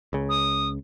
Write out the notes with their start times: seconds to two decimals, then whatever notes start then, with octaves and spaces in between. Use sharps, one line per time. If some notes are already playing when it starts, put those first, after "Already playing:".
0.13 C#2 C#3
0.29 D#6